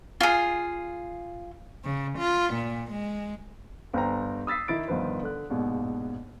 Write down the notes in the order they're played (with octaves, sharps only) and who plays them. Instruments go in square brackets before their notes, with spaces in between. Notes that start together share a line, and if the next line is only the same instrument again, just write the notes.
[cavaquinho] F4 G#4
[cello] C#3
F4
A#2
G#3
[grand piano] G1 C5 G5 A#5
D#6 E6 A6 B6 C7
D#3 E4 A6 D7
G1 D#3 F3 B4 C5
D3 F#6
A#1 D#2 G#2 B2